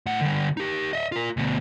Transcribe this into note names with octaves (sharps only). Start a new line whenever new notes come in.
A2 F#5
D3 G3
D#4 G4
D#5 E5
F4 A#4
D2 B2